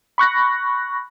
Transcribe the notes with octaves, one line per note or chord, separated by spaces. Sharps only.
B5 C#6 F#6 A#6